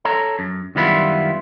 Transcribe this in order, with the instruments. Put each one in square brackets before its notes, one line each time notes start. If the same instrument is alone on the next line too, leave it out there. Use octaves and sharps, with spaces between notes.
[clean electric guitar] A4 C#5 A#5
F#2
F#2 D#3 G3 B3 E4 F4